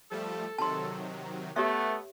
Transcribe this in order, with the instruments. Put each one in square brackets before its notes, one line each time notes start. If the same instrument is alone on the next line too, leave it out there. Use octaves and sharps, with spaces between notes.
[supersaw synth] F3 G3 A3 [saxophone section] A4
[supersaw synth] C3 D#3 F#3 [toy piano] A5 C6
[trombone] A3 [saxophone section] B3 [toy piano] G4 C#5 E5